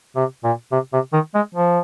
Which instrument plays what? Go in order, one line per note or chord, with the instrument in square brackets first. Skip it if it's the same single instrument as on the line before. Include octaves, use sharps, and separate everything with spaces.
[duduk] C3
A#2
C3
C3
D#3
G#3
F3